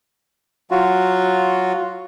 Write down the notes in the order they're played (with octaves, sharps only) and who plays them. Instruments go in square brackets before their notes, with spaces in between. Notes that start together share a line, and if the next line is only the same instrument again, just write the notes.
[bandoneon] F#3 F4 F#4